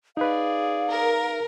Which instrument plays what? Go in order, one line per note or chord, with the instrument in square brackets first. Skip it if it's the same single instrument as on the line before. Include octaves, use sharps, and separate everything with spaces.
[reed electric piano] D#4 B4 [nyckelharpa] G#4 D5 [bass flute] F5
[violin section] A#4